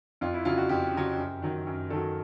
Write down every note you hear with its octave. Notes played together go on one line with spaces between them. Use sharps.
F2 F4
E4
C#3 F#3 F4
F#4
F2 G4
C#3 F#3
F#2
D#3 F#3
F#2
D#3 F#3 A4